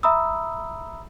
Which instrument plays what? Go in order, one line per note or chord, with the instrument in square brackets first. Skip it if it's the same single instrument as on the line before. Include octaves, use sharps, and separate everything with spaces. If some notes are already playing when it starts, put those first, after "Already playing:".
[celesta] E5 A#5 B5 D#6 E6